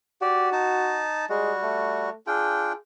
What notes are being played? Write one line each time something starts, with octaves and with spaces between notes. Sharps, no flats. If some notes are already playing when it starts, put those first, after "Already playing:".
F#4 G4 D5
D#4 A5
G3 G#3 F#4
A3
D4 F4 G#4 G5